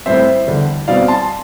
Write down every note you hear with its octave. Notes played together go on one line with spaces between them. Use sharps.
A2 G3 C4 C5 E5
E2 D3 G3
B2 G3 C4 D5 F5
A5 C6